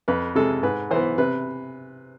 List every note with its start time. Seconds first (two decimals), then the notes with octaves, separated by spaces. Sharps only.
0.08 F2 B4
0.35 C3 G#3 A4
0.63 G#2 B4
0.91 E3 B3 C5
1.18 C3 B4